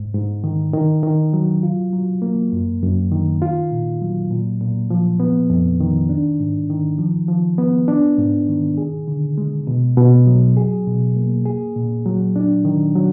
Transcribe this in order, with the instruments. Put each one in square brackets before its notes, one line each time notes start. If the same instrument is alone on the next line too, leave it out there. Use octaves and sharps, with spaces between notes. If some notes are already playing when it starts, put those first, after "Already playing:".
Already playing: [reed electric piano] G#2
G#2
D#3
D#3
D#3
F#3
F4
F#3
A#3
F#2
F#2
D#3
F4
A#2
F#3
A#2
A#2
F3
B3
F2
D#3
D4
G#2
D#3
F3
F3
B3
D4
G#2
D#3
G#4
D3
G#3
B2
B2
F#3
G#4
B2
A#3
G#4
A#2
F#3
D4
D#3
F#3